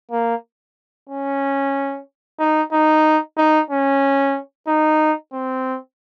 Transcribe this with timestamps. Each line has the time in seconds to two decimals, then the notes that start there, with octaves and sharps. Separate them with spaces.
0.11 A#3
1.09 C#4
2.39 D#4
2.72 D#4
3.37 D#4
3.70 C#4
4.67 D#4
5.33 C4